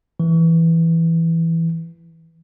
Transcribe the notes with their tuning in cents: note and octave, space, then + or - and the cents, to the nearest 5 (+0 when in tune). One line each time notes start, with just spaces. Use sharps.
E3 +0